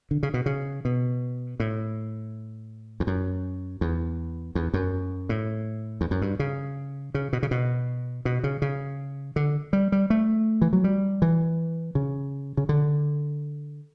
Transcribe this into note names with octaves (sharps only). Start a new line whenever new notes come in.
D3
C#3
B2
C#3
B2
A2
E2
F#2
E2
E2
F#2
A2
E2
F#2
G2
C#3
C#3
B2
C#3
B2
B2
C#3
C#3
D3
G3
G3
A3
E3
F#3
G3
E3
C#3
C#3
D3